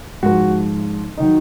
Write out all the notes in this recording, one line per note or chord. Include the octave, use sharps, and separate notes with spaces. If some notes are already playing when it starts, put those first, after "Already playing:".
G#2 F3 F#4
D#3 F#3 D#4